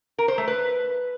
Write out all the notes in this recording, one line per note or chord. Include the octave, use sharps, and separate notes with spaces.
A#4
C5
A3
B4